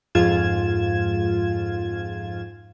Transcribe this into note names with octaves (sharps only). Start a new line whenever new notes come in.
F2 G#2 F4 G#6 E7